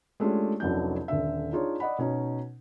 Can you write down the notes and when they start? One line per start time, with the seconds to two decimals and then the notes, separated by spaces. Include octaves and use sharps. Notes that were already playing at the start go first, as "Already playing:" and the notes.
0.20 G#3 A3 C#4 D4 F4 G4
0.60 F1 C2 F#3 C#4 D4 G6
1.08 D#1 D3 E5
1.53 D4 D#4 F4 G#4 C#5
1.80 D5 D#5 F#5 B5
1.98 B2 C#4 D#4